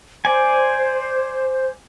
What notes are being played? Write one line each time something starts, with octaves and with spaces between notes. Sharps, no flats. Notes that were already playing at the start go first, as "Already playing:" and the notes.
C5 D5 G#5